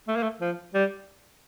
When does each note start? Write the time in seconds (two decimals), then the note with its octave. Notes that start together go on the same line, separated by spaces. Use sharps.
0.08 A3
0.16 A#3
0.23 A3
0.41 F3
0.74 G3